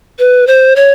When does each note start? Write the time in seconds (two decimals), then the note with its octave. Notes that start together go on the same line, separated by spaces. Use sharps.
0.19 B4
0.47 C5
0.76 C#5